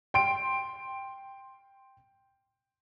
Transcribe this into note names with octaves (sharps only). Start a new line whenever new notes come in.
G5 C6 D7